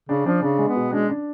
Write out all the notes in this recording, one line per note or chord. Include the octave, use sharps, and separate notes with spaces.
C#3 D4
F3 D4
C#3 D4
G#3
B3
B2
G#3 D4
D4